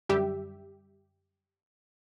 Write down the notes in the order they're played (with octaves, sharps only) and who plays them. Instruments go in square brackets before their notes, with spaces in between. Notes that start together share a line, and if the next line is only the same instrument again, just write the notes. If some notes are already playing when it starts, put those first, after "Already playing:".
[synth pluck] F#2 D3 G3 G4 E5